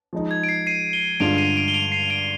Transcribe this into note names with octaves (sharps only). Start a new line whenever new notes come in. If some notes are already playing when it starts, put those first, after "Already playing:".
F3 G#3 D#4
G#6
D7
C7
C7 D#7
D#7 G7
G2 D3 G#3 D4 F4 D7 F7
C7 D#7
D7 F7
G7
D7 F7
C7 D#7
D7 F7